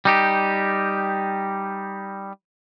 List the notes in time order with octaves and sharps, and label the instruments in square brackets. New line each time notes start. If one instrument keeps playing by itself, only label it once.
[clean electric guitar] G3 D#4 G4